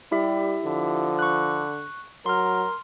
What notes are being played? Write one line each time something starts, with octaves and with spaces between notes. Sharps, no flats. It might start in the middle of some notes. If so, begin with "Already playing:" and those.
G3 E4 G4 E5
D3 F3
C#6 F#6
F#3 A#4 C6 F6